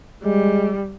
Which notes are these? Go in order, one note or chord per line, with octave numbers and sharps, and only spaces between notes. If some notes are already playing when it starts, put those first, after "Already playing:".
G3 G#3